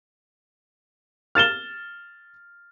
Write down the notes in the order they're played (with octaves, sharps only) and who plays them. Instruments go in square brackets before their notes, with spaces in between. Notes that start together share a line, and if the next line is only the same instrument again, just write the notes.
[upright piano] F6 A6 E7 G7